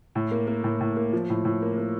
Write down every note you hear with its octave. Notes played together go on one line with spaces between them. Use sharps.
A2
A#3
A#3
A2
A2
A#3
F3
A2
A2
A#3
A#3